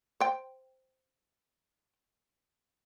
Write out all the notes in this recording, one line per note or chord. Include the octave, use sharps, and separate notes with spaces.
C5 G5